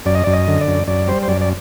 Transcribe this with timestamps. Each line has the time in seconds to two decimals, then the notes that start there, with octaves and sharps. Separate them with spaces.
0.05 F#2 D5
0.15 D#5
0.24 F#2 D5
0.33 D#5
0.48 D3
0.61 D5
0.68 F#2
0.87 F#2 D5
1.08 G3 C5
1.23 C5
1.28 F#2 D5
1.41 D5